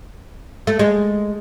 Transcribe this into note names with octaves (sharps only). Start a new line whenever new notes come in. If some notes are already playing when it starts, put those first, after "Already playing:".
A3
G#3